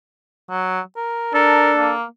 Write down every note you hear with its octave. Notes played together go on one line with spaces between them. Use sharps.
F#3
A#4
D4 A4 A#4
A#3